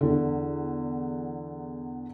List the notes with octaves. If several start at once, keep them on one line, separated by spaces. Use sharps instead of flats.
E2 D3